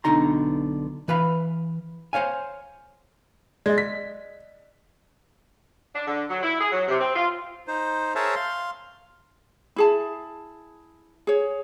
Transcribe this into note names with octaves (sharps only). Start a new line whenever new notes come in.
B1 B2 D3 D#4 A#5 C6
E3 B4 F5 B5
C5 C#5 F5 G#5
G#3 D5 D#5
B6
D4
D3
F#3
E4
G#4
F#3
C3
C4
F4
D#4 C5
G#4 A#4 C5 C#5 E5 A5
F5 C6
E4 G#4 A5
G#4 C#5